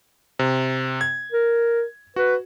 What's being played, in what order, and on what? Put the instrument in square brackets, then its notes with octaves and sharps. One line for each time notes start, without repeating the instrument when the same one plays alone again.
[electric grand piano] C3
G#6
[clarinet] A#4
[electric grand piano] F#4 [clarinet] B4